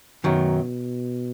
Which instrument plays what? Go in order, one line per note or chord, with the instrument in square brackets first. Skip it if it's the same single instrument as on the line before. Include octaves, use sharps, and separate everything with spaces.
[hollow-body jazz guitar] F#2 D#3 F#3 [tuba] B2